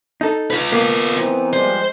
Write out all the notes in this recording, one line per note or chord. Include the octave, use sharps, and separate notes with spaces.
D#4 A4
F4 B4
A#3 B3
E3 C4 D#4
F3 G3 G#3 C5